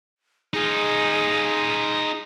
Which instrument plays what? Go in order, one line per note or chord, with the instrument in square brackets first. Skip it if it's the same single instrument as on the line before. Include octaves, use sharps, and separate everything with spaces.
[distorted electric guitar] D#4 F4 [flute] G#4